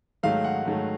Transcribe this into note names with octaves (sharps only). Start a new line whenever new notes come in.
G#2 D#3 F#3 A3 F5
F#5
G#2 D#3 F#3 A3